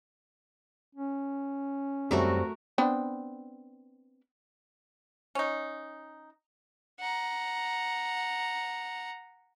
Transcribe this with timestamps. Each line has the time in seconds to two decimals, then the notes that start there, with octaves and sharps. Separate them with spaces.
0.95 C#4
2.11 F#2 G3 A3 C4 F#4 A#4
2.78 B3 C4 D4
5.35 C#4 D#4
7.00 F#5 A#5